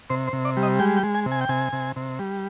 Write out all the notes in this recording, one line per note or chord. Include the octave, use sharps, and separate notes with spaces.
C3 C5
C5
C3
D5
G3
D#5
G#3 G5
G5
G#3
G#5
C3
G#5
G5
C3 G#5
C3
C3
G3